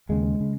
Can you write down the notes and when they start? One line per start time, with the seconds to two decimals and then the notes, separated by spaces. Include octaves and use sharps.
0.09 D#2 C#3 G#3
0.40 C#3